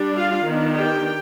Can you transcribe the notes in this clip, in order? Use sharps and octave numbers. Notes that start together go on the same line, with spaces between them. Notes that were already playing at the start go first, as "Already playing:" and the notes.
Already playing: G3 D4
F4 F5
D#3 B3 D4
G4 G5